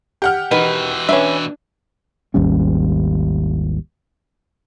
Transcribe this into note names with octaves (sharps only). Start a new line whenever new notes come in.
G4 F#5 F6
B2 D#3 E3 B4
C#4 D4 B4 E5
G#1 D#2 G3 C#4